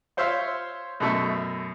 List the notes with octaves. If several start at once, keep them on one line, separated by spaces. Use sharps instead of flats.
F4 C5 C#5 E5 F5 C6
F#2 B2 A3 E5 C#6